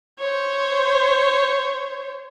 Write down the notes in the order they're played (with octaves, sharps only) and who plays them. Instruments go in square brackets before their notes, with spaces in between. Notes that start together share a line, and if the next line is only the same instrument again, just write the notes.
[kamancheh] C5 C#5